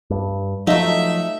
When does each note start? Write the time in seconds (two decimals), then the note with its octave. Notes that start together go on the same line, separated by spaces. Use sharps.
0.10 G2
0.67 F3 F#3 A3 D#4 E5